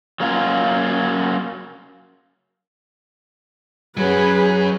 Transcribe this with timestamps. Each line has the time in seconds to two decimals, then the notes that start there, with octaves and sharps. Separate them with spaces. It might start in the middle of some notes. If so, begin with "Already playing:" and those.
0.20 F#3 A#3 C#4 F4
3.97 F#3 C#4 G#4 B4